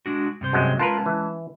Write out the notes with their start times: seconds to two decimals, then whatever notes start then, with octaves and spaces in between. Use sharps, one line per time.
0.06 G#3 D4 F#4
0.41 G2 C3 C5
0.53 F#2 F#3 G#3
0.79 G#3 C#4 F4 A#4 B4 A5
1.06 E3